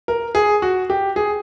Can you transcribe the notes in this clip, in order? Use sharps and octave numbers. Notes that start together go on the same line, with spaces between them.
A#4
G#4
F#4
G4
G#4